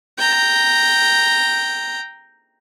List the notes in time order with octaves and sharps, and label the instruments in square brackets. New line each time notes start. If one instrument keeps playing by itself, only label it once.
[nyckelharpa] G5 A#5